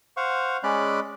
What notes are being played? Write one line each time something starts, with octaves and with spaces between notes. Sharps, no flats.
C5 F5 F#5 C#6
G#3 C#4 D5 B5 F#6